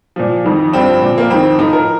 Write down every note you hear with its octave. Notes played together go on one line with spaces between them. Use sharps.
A#2 F3
F2 D#3
G2 D3 F3 C4
A#2 F3
A#3
F2 D#3 C4
A2 F3 D#4
A#4